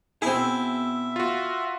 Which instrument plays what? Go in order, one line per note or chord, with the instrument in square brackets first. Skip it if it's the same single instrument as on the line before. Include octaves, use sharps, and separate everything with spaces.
[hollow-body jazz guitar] B2 G#4 [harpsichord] C4 E4 [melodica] E5
[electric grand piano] F4 F#4